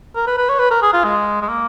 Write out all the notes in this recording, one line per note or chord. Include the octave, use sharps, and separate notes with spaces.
A#4
B4
B4
C#5
B4
A#4
G#4
F4
G#3
G#3
A#3